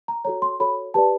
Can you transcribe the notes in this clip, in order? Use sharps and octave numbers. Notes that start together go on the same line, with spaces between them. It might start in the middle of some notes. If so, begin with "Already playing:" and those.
A#5
F#4 A4 C#5 A#5
C6
F#4 A4 C#5 B5
G4 B4 D5 A5